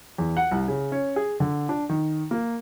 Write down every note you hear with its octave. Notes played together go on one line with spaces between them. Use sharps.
E2
F#5
C2
C#3
C#4
G#4
D3
D4
D#3
A#3